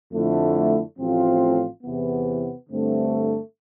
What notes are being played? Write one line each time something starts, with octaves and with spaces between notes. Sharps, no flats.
F2 D3 A3 E4
A1 A2 F3 C4 F4
E2 C3 E3 B3
G2 D3 A3 C4